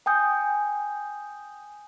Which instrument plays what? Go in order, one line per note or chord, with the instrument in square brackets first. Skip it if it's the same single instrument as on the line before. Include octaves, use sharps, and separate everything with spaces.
[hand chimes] G5 G#5 D#6 G6